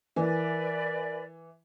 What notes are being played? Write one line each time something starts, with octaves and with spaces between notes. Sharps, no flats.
E3 A#4 B4 D5 E5 G#5